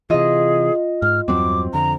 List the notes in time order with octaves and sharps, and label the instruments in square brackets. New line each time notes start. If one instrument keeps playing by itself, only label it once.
[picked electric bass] C3 E3 [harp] F4 D#5 [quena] G#4
[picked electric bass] G#2 [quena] F6
[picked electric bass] E2 G2 F#3 [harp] C4 [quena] D6
[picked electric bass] F2 D3 [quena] A#5